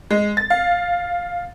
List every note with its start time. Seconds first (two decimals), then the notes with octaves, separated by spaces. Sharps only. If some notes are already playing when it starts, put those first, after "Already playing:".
0.11 G#3
0.37 A6
0.50 F5